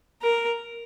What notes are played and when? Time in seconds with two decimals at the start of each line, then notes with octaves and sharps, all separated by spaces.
0.22 A#4